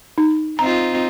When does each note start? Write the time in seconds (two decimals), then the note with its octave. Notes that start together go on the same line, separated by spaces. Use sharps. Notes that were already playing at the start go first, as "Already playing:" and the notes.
0.18 D#4
0.59 C4 D#4 F4 A#5